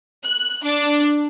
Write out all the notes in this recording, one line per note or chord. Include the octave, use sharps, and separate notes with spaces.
F#6
D4